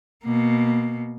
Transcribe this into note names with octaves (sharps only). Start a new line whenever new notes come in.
B2 A#3